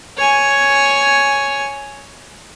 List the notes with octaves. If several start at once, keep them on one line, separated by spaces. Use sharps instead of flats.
C#5 G#5